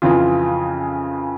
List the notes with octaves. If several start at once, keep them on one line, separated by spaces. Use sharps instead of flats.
F2 C#3 E3 F4